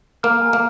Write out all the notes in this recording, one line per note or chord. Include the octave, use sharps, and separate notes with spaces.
A#3 F6
G#5
A#5
A#3